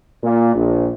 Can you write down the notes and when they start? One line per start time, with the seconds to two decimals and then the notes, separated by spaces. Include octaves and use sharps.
0.23 A#2
0.55 A#1